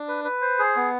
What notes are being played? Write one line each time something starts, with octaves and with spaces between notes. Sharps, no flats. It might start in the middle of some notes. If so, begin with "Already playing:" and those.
Already playing: D4
B4
B4
C5
G#4
B3